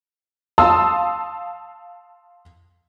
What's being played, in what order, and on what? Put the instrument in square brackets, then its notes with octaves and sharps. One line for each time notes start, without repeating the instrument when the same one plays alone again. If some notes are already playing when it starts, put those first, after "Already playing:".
[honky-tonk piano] F5 A5 C6 D#6 E6